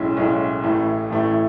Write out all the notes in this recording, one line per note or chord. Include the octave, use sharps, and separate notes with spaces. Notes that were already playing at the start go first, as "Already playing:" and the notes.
Already playing: B1 A2 G#3 C#4 E4
B1 A2 G#3 C#4 E4
A1 A2 E3 A3
A1 A2 E3 A3